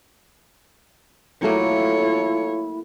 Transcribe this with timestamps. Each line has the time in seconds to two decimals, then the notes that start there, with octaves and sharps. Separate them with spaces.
1.43 F#3 A3 A#3 E4 F4 A4 C#5